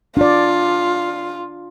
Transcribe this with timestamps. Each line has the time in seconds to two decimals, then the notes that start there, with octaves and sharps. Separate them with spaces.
0.17 D4 F4 D5